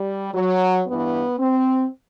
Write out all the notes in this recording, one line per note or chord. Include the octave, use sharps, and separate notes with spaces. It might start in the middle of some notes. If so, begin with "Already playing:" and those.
Already playing: G3
F#3
G2 E3 B3
C4